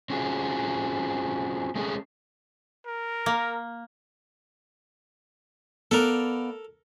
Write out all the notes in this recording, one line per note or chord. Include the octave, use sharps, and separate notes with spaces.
C4 C#4 F4 F#4 G#4
G#3 A3 C4 C#4 G4 G#4
A#4
A#3
B3 A4 A#4 D5 F5